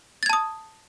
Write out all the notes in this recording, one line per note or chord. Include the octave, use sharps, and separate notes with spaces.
A5 D#6 G#6 A6